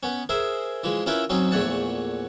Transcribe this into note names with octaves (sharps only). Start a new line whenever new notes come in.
B3 C#4
G#4 A#4 C5 E5
E3 F3 G#3
C#4 E4 F4 A#4 B4 E5
F#3 C4 C#4 D#4
A#1 E2 A3 C#5 F#5 A5